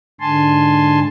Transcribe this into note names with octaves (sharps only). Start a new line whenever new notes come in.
G#2 D3 G#5 A5 C6